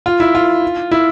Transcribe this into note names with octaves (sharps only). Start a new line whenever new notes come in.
F4
E4
F4
E4